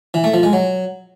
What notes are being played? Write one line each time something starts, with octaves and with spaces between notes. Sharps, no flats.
E3
A3
F3
G#3
F#3